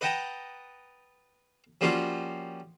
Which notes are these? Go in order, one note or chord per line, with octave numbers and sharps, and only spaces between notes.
B4 D#5 F#5 G5 A5 A#5
F3 G3 A#3 C#4 F4 F#4